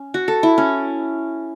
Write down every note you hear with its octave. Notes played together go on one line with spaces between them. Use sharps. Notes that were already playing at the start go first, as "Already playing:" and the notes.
Already playing: C#4
F#4
A4
E4
C#4